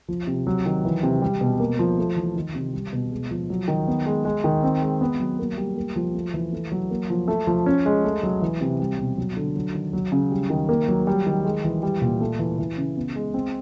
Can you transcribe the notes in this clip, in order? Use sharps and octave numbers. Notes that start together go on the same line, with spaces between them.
F3
C3
F#3
D#3
E3
C3
G3
B2
A#3
F3
A3
E3
D#3
C3
G3
B2
G#3
F3
F#3
D#3
B3
G#3
G#3
D#3
C4
G#3
B3
F#3
A#3
G3
A#3
F3
A3
E3
A3
F#3
A#3
F3
A3
F3
C#4
G#3
A3
F#3
E3
C3
G3
B2
F#3
D3
F#3
D#3
F#3
C#3
G3
D#3
A#3
F#3
G3
D#3
G#3
E3
G3
A#2
A3
E3
E3
C#3
B3
G#3
C4